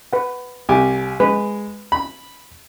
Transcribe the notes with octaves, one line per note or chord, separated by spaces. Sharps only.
B4 F#5
C2 G4 G#5
G#3 B4
B5